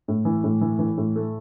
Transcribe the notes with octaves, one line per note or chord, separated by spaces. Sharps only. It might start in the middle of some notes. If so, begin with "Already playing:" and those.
A2
E3
A2
E3
E3
A2
A3